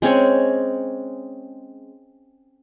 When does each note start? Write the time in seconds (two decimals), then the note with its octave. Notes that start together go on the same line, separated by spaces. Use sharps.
0.02 G#3 C4 C#4 C#5